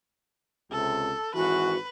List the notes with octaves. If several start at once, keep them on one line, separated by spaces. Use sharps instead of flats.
C#2 C3 A4
G#1 E3 F#4 B4